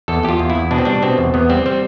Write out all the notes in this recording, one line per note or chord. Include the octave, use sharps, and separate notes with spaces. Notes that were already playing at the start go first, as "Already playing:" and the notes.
E2 A4
E2 G4
F4
E2
E4
E2
B2 D4
C4
G3 D4
B2 C4
E2
E2 B3
G3 C4
G3 C4